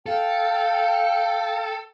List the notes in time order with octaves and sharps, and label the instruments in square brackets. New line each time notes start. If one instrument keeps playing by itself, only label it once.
[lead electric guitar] A4 [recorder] F5 [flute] G5